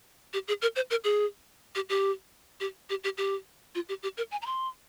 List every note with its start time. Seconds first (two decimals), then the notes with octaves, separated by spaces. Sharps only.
0.33 G4
0.48 G#4
0.62 A#4
0.76 C5
0.91 A#4
1.04 G#4
1.75 G4
1.89 G4
2.60 G4
2.90 G4
3.04 G4
3.18 G4
3.75 F4
3.89 G4
4.03 G4
4.17 A#4
4.31 G#5
4.42 A#5
4.46 C6